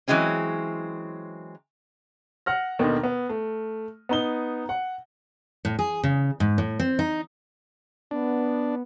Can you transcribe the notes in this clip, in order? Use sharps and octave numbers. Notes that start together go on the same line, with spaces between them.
E3 F#3 G#3 C4 C#4
F#5 F6 A#6
D#2 B2 D3 D#3
B3
A3
B3 D#4 G7
F#5
A2
G#4
C#3
G#2
A2
C4
D#4
B3 D4